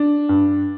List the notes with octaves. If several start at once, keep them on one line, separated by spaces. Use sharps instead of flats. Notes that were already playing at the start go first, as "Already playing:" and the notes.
Already playing: D4
G2